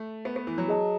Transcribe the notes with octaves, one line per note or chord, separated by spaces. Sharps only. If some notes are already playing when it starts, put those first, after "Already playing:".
Already playing: A3
B3
B3
E3
F#3
G#4 D#5 A5